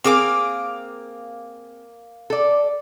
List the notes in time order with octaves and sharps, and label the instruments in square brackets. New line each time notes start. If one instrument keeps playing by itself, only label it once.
[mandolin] A#3 F5 D6 [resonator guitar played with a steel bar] C4 G#4
[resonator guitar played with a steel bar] A4 D5